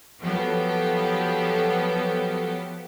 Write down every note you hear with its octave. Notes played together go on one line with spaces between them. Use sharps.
F3 F#3 B3 G4 A4